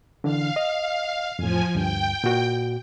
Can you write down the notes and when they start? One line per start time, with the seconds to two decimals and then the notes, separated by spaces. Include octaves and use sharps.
0.24 D3 E3 D4 F5
0.56 D#5
1.39 F2 A2 F3 G#5
1.75 D2 G2 G5
2.24 A#2 F#4